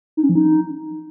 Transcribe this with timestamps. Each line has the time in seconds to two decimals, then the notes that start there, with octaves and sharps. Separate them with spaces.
0.17 D#4
0.23 C#4
0.29 F3
0.35 D#4